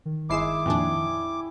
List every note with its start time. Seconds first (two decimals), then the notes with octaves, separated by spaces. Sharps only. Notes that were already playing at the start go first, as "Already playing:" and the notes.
0.05 D#3
0.30 G1 G#3 E4 D6 C7 E7
0.66 F2 A#2 D4 C#5 G5 G#5